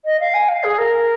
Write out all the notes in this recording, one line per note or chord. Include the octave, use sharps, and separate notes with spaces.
D#5
F5
G#5
F5
G#4
A#4